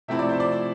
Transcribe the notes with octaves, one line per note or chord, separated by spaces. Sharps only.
C3 F3 A3 C4 E4 E5
D5
C5
D5